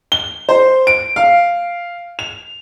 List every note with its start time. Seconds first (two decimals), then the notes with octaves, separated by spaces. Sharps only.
0.12 G7
0.49 C5
0.87 D7
1.16 F5
2.19 F7